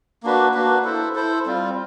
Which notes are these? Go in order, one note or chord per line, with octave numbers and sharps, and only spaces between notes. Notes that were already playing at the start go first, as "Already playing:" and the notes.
A#3 D4 F#4 B4
A#3 D4 F#4 B4
E4 A4 C5
E4 A4 C5
G3 C4 F4